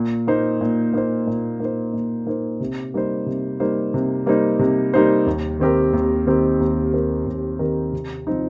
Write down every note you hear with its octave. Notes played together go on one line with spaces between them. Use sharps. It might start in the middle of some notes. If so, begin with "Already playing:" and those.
Already playing: A#2
A#3 D#4 C5
A#2
A#3 D#4 C5
A#2
A#3 D#4 C5
A#2
A#3 D#4 C5
C3
G3 A#3 D#4 C5
C3
G3 A#3 D#4 C5
C3
G3 A#3 D#4 C5
C3
G3 A#3 D#4 C5
D#2
D#3 C4 G4 A#4
D#2
D#3 C4 G4 A#4
D#2
D#3 C4 G4 A#4
D#2
D#3 C4 G4 A#4
C3
F3 C4 D#4